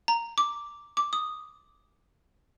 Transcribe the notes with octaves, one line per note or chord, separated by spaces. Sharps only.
A#5
D6
D6
D#6